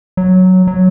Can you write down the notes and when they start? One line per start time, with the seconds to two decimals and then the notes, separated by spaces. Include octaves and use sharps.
0.17 F#3
0.67 F#3